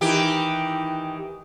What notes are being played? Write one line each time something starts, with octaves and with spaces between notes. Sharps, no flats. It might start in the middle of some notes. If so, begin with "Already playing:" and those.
D#3 E3 G4